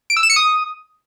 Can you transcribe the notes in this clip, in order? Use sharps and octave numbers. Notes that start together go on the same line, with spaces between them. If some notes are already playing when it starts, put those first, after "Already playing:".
D7
E6
E7
C#7
D#6